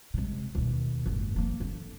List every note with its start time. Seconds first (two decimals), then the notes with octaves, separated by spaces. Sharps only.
0.14 C3 G#3
0.55 D#2 B2
1.06 F#1 G#2
1.36 F3 A#3
1.60 D3